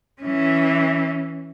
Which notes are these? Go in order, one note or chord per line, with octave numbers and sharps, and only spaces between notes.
E3 C#4